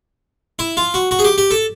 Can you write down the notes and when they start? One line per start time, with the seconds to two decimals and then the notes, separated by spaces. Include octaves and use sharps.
0.59 E4
0.77 F4
0.94 F#4
1.11 F#4
1.19 G#4
1.24 G4
1.38 G4
1.51 A4